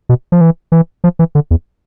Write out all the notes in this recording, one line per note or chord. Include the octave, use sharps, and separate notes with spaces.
B2
F3
E3
E3
F3
E3
D3
E2